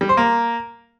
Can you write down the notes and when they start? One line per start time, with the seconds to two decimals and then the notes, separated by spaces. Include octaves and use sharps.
0.01 G3
0.09 C5
0.17 A#3